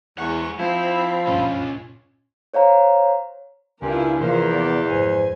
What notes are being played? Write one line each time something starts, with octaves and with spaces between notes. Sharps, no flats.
E2 G#3 F#5 C#6
F3 C4 E4 B5
C#2 G2 A#2 C#4 F4
C5 C#5 F5 A#5
C#2 G2 C4 E4 F4 A#4 G#5
E2 C3 E3 F3 A#3 A#4 C5
B3 D5
G#1 F2 G#2 C5 G#5